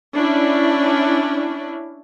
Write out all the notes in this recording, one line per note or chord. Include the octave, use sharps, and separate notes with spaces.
C#4 D4 E4